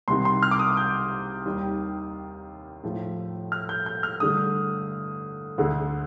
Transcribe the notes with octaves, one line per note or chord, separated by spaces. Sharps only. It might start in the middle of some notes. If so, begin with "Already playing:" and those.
C2 C3 D#3 C6
C6
F6
D6
D#6
G6
D#2 D#3 G3
A2 F3 A3
F6
G6
G6
F6
G2 D3 A3 D#6
D2 D3 A3